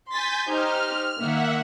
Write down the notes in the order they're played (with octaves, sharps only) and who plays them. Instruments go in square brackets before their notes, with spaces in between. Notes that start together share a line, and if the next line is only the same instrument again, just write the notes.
[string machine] G#5 G6 [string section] C6 A6 B6
[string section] D#4 G4 C5 [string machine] F6
[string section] D#3 A#3 [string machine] E5 F#5